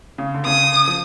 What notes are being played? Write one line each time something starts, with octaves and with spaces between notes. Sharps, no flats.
C#3
D3
C#3 D#6
F3